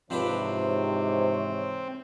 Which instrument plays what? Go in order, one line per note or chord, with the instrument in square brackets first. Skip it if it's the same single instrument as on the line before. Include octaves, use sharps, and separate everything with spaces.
[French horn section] G#2 C3 E3 [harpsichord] F3 D4 B4 [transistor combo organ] C4 [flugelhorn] C#5